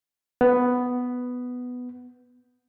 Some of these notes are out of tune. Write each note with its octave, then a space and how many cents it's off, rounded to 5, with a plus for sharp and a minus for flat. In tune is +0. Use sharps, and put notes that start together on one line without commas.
B3 +5